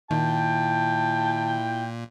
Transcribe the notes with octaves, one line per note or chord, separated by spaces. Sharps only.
A#2 D#3 E4 G5 A5